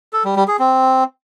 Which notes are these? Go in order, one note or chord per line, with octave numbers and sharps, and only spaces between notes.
A4
G3
G3
G#4
C4